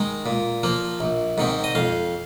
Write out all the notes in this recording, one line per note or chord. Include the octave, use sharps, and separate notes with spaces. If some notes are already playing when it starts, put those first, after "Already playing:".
Already playing: D#3 G#3
A#2
F3 A#3
A#1
G#2 D#3 C4
D#5
F2 F5